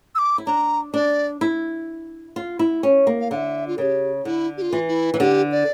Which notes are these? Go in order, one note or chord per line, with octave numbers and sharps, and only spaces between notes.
E6
D6
E4
D4 A#5
D4 D5
E4
F4
E4
C#4
A#3
F5
D3 E5 F5
F4
C#3 G4 A#4
D3 E4
G4
F4
E3
E4
E3
D3 G4
D5